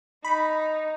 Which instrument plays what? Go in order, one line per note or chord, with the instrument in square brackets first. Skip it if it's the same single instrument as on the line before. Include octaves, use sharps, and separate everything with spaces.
[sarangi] D#4 [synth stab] B5